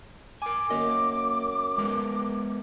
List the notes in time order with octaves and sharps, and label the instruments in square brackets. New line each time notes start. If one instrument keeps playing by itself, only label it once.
[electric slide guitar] A#4 G#5 [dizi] D6
[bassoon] F#2 [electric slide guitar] A#3 D#5
[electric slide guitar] G#3 B3 A#4